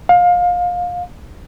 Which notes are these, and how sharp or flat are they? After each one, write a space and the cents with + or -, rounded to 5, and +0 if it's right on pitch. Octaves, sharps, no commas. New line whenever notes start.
F5 +25